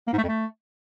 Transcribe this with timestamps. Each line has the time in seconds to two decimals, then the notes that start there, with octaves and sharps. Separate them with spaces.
0.08 A#3
0.13 G#2
0.18 A3
0.23 F2
0.29 A3